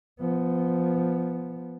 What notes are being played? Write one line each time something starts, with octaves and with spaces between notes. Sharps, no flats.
F3 B3